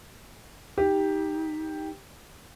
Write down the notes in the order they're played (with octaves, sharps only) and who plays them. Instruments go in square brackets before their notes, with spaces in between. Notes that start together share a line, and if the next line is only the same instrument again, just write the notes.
[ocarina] D#4 [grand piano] G4